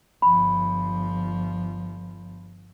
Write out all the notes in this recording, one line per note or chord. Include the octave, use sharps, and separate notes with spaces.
G1 F3 B5